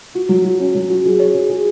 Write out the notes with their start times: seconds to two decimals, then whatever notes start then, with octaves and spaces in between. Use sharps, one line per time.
0.15 F#4
0.29 F#3
0.44 F#4
0.60 C#4
0.75 F#3
0.90 F#4
1.05 G#4
1.19 C#5
1.34 G#4
1.49 G#4